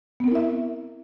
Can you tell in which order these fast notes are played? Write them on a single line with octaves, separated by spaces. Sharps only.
B3 C4 A#4 E4 E5